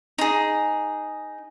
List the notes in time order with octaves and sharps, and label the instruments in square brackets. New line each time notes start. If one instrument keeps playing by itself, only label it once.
[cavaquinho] D#4 G#4